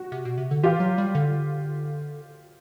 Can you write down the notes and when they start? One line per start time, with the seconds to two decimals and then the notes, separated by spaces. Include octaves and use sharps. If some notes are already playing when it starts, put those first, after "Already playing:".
Already playing: F#4
0.12 C3
0.25 B2
0.38 C3
0.51 D3
0.63 E3 F4 G4
0.80 F#3
0.98 G3
1.15 D3